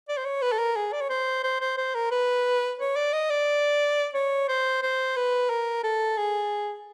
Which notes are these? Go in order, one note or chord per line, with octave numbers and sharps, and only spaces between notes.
D5
C5
C#5
B4
A4
A#4
G#4
D5
C#5
C5
C5
C5
C5
A#4
B4
C#5
D5
D#5
D5
C#5
C5
C5
B4
A#4
A4
G#4